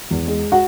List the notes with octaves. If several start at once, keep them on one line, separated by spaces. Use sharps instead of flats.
E2
G#3
F#4 F#5